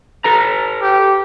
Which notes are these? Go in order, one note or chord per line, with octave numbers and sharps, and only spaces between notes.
A4 B4 A#5
G4